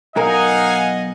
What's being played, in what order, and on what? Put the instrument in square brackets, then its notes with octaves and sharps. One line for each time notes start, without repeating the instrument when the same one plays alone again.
[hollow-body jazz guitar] B1 A#4 [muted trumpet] D#4 [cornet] D#5 [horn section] F5 F#5 G#5